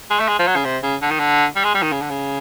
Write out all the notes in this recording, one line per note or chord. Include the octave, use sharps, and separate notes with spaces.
G#3
A3
G#3
F3
F#3
C#3
C3
C#3
D3
D#3
D3
G3
G#3
G3
D#3
C#3
D3
C#3